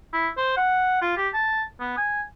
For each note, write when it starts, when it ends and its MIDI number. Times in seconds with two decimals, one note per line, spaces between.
0.13 0.28 64
0.37 0.55 72
0.57 0.97 78
1.02 1.15 65
1.17 1.28 67
1.33 1.63 81
1.80 1.92 59
1.98 2.22 80